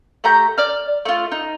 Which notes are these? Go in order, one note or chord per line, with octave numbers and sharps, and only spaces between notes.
A3 G4 A#5 G6
D5 F6
A3 F4
D#4